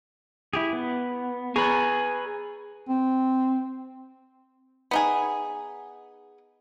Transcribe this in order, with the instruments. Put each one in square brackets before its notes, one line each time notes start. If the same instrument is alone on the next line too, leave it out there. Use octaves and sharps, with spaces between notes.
[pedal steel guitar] E4 G4 G#4
B3
[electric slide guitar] G#4 B4 [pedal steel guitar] G#5 A#5 C#6
[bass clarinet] C4
[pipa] B3 D#4 G#4